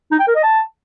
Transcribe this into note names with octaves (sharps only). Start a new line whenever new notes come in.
D#4
G5
A#4
D#5
A5